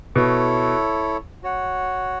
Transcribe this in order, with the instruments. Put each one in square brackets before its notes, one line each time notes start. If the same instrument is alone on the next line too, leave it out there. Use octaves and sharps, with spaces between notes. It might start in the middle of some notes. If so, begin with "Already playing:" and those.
[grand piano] B2 [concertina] E4 A4 C#5
[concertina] F#4 C#5 F#5